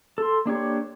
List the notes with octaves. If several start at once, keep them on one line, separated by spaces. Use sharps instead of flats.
A4 C6
A#3 D4 G4 C#5